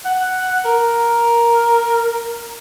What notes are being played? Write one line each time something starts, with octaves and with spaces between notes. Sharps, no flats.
F#5
A#4